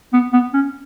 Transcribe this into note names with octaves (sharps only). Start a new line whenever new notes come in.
B3
B3
C#4